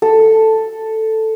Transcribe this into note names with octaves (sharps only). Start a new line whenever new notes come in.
A4